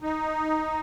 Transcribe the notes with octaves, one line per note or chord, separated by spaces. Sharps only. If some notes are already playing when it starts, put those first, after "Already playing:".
D#4